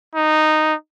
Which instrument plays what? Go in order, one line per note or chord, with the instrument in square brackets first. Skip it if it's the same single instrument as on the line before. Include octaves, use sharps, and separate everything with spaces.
[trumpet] D#4